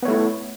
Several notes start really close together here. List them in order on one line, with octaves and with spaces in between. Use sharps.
B3 C#5 A3 E4